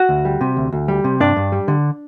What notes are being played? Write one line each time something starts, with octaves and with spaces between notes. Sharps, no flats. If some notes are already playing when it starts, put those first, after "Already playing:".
Already playing: F#4 F#5
D2
G3
C3
D2
D2
G3
C3
G2 D4 D5
G2
G3
D3